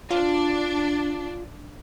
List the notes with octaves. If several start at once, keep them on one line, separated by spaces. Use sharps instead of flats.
D4 F4